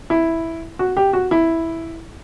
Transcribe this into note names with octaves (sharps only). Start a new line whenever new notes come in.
E4
F#4
G4
F#4
E4